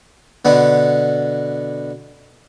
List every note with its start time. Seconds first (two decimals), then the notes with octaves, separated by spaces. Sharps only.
0.45 B2 D3 B3